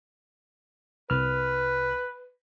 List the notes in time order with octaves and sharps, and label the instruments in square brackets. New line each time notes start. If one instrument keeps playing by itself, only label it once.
[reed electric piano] C2 F6 [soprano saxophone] B4